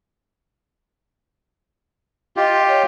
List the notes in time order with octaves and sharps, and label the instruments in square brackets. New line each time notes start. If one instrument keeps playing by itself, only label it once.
[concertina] F4 G4 [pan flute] D#5
[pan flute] C#5